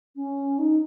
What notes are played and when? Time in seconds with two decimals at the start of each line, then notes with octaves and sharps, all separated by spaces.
0.15 C#4
0.58 D#4